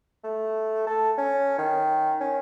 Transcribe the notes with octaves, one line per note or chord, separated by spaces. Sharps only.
A3
A4
C#4
D#3
C#4